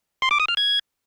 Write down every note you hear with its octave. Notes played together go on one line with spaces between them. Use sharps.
C6
D6
D#6
F6
G#6